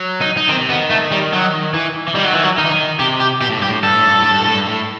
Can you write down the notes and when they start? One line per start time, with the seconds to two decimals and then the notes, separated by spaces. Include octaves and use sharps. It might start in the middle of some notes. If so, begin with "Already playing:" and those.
Already playing: F#3
0.21 D#4
0.37 D#4
0.49 D#3 C4
0.61 C3
0.70 D#3 B3
0.90 A3
1.11 G3
1.33 F#3
1.74 E3
2.08 E3
2.15 D#3 G3
2.25 F#3
2.34 E3
2.44 F#3
2.58 D#3 D#4
2.65 E3
2.72 D#3
2.99 C3 G4
3.20 G4
3.41 B2 G4
3.50 A2
3.59 G2 G4
3.68 A2
3.83 G2 A4
3.94 A2
4.06 G2
4.19 A2
4.31 G2
4.43 A2
4.54 G2
4.67 A2